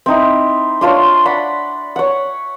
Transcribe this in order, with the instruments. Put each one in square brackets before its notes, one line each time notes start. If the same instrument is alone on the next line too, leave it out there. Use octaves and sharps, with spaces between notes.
[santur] C4 D#4 E4
D4 F4 C5 C#5
D5 F#5 B5 C6
C#5 F#5